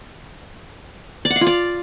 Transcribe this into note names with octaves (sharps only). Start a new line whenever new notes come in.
D5
F#5
F5
F4
D5